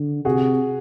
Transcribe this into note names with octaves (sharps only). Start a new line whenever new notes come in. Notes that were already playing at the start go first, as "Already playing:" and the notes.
Already playing: D3
C3 F#4 G#4